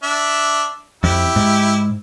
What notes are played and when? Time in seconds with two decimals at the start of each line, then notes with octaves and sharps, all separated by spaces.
0.03 D4 E5
1.04 F2 E4 G4
1.36 G#2